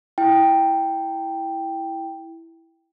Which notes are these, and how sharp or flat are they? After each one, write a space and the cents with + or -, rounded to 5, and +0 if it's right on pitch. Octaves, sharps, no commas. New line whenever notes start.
E4 +0 G5 +0